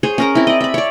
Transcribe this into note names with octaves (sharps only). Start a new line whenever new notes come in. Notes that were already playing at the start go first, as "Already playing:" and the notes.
G#4 C5 C#5
C#4 A#4 A#5
C4 E4
D5 D#5
E5 B5
C#5 D5